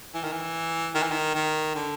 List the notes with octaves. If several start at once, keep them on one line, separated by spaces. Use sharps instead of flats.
E3
D#3
E3
D#3
E3
D#3
D#3
D3